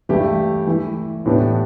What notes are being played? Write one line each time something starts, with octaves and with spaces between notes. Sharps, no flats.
G2 E3 A3 E4 G4
E3 A3 E4
A2 E3 B3 D4 G4